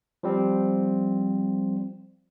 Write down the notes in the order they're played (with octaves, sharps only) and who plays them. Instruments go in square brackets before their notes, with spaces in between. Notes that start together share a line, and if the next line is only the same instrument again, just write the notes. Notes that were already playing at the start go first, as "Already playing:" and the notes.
[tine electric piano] F3 G3 C4